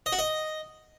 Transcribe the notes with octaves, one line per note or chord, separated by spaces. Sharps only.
D#5
F#4
D#5